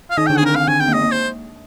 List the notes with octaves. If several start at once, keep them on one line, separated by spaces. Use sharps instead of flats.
F5
D#3 D#4 D#5
D3 D4 G5
D4 G#4
C4 A#4
C4 F5
D3 D4 G#5
C4 G5
A#3
G#3 D#5
A#3
C5